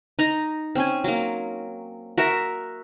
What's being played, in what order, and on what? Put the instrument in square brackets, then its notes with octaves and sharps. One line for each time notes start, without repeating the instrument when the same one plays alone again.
[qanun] D#4 A#5
C4 C#4 G#5
F#3 A#3
F#4 A#4 E5 A#5